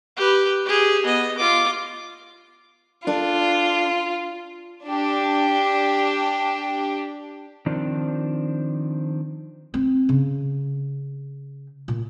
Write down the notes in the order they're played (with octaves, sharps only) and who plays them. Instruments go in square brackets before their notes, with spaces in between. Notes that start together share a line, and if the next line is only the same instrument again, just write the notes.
[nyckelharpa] G4 B4
G4 G#4
B3 D#5
F4 D6
[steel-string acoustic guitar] D4 A4 [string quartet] F4
[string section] D4 G4
[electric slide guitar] D#3 F3 C4 D4
[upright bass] C4
C#3
A#2